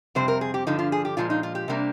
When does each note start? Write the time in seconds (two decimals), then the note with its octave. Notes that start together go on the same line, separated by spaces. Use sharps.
0.15 F2 C3 G3 C4 C5
0.28 A#4
0.41 G#4
0.54 G4
0.67 G2 D3 F3 D#4
0.79 F4
0.92 G#4
1.05 G4
1.17 A#2 F3 G#3 F4
1.30 D#4
1.43 F4
1.55 G4
1.68 C3 G3 A#3 D4